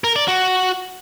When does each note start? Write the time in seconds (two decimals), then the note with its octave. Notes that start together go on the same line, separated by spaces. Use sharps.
0.04 A#4
0.16 D5
0.28 F#4